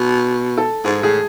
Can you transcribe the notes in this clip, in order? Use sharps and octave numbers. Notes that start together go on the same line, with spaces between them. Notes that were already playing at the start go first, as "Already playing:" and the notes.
Already playing: B2
A4
G#2 G#4
A2 G#4